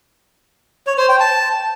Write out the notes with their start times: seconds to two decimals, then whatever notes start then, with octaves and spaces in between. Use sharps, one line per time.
0.87 C#5
0.98 C5
1.09 G5
1.20 A5